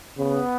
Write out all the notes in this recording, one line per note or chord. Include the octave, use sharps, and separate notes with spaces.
C#3 B3